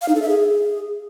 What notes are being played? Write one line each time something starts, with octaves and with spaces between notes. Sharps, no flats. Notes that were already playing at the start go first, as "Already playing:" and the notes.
F5
D#4
A4
E5
G#4